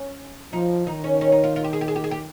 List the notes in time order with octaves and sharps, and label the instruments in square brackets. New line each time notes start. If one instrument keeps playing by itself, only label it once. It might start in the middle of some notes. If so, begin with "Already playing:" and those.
Already playing: [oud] C#4
[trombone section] F3 [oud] D#4
[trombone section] D#3 [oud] D#4
[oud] C#4
C#4
D#4
F4
F4
G4
G#4
G4
G#4
G4
G#4
G4